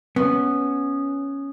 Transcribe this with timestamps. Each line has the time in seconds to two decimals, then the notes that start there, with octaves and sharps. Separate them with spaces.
0.16 B3 C#4